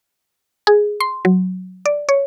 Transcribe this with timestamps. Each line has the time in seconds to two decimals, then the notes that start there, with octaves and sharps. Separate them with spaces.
0.67 G#4
1.00 C6
1.25 F#3
1.86 D5
2.09 C#5